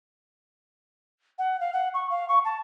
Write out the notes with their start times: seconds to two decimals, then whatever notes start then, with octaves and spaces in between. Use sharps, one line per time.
1.38 F#5
1.60 F5
1.73 F#5
1.94 C#6
2.10 F5
2.28 C#6
2.44 A5